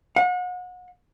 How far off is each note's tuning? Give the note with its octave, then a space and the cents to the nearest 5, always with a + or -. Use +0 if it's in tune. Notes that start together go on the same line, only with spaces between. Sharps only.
F#5 -35